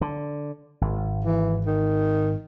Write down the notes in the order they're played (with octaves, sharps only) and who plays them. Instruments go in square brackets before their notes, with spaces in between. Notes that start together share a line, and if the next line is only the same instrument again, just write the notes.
[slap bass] D3
G#1
[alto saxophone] E3
D#3